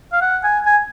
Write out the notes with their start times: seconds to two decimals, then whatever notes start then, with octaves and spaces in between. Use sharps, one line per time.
0.13 F5
0.21 F#5
0.43 G#5
0.66 G#5